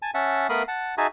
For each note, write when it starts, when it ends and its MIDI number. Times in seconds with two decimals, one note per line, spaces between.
0.02 0.11 80
0.02 0.11 81
0.14 0.47 61
0.14 0.47 76
0.14 0.47 78
0.14 0.47 81
0.49 0.63 57
0.49 0.63 59
0.49 0.63 70
0.49 0.63 77
0.49 0.63 83
0.49 0.63 87
0.68 0.95 78
0.68 0.95 81
0.98 1.07 63
0.98 1.07 66
0.98 1.07 68
0.98 1.07 76
0.98 1.07 80
0.98 1.07 81